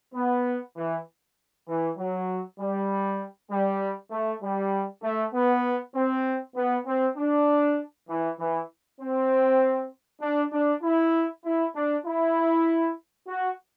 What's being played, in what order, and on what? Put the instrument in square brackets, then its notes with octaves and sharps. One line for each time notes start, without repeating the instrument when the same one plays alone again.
[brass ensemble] B3
E3
E3
F#3
G3
G3
A3
G3
A3
B3
C4
B3
C4
D4
E3
E3
C4
D4
D4
E4
E4
D4
E4
F#4